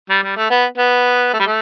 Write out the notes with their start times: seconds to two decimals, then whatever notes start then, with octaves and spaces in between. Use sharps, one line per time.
0.09 G3
0.23 G3
0.37 A3
0.50 B3
0.78 B3
1.34 A3
1.40 G3
1.46 A3